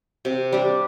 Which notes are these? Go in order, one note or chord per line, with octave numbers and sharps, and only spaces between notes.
C3
G3 D4